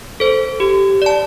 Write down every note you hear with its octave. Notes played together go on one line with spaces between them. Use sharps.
A4 C5
G4
D5 A5